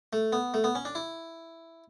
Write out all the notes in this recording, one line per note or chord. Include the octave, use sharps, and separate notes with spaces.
A3
B3
A3
B3
C#4
D4
E4